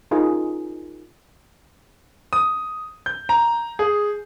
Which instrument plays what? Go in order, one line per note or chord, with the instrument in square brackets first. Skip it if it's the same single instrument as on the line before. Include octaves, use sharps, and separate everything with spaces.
[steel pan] D#4 F4 G#4 A#4
[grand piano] D#6
G6
A#5
G#4